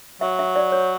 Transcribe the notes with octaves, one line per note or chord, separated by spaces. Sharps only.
F#3 E5
E5
D5
C#5